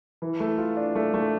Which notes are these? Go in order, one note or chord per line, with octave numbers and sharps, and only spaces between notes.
E3
A3
F4
D4
A3
A3